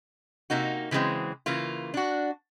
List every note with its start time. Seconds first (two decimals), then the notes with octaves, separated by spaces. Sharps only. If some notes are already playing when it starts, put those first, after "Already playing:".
0.50 C3 A#3 D#4 F#4
0.91 C#3 E3 F#3 G#3 C4
1.46 C#3 E3 A#3 F4
1.94 D4 F#4